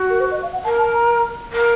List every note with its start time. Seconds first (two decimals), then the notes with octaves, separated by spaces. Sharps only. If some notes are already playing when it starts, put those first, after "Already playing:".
Already playing: F#4
0.10 A#4
0.20 C5
0.31 D#5
0.42 F5
0.53 F#5
0.64 A#4 A5
0.79 A5
0.94 A#5
1.52 A#4